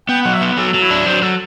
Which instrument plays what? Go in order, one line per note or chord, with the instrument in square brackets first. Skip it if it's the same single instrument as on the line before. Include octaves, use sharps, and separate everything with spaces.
[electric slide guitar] B3 [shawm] G5
[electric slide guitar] F#3 [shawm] F#5
[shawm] E5
[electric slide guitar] B3
[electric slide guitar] F#3 [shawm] A4
[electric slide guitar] F#3
[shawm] E4
[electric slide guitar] D4
[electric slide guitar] F#3 [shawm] C5
[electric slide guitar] F#3 [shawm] A4